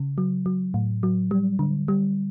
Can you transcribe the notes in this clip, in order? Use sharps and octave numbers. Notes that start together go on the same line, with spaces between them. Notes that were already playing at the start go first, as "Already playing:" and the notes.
Already playing: C#3
F#3
F#3
A2
F#3
G3
D3
G3